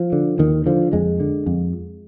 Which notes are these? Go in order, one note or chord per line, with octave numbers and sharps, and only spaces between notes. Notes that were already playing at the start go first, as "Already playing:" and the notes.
Already playing: F3
D3
D#2 D#3
D3 F3
F2 G#3
D3
F2